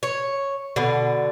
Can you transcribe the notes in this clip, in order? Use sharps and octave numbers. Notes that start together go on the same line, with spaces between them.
C#5
B2 D3